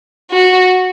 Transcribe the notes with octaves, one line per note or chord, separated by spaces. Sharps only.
F#4